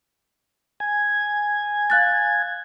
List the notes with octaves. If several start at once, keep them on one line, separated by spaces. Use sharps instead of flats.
G#5
F5 F#6 A6